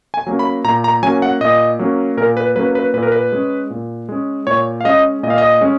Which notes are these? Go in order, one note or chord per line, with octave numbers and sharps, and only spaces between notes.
G#5
F#3 A#3 C#4
B5
A#2 A#5
A#5
F#3 A#3 C#4 G#5
F#5
A#2 D#5
F#3 A#3 C#4
A#2 A#4
B4
F#3 A#3 C#4 B4
B4
A#2 B4
A#4
B4
G#3 C#4
A#2
G#3 C#4
A#2 C#5
F5
G#3 C#4 D#5
A#2 D#5
F5
D#5
G#3 C#4